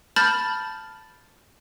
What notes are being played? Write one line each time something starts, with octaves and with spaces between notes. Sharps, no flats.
A5 B5 F6 G6 A6